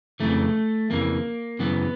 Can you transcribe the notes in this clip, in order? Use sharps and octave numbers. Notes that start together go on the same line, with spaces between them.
F2 C#3 E3 A3
F2 C#3 E3 A#3
F#2 C#3 E3 B3